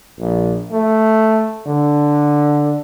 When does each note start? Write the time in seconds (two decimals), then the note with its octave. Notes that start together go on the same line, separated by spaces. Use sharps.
0.19 A#1
0.72 A3
1.67 D3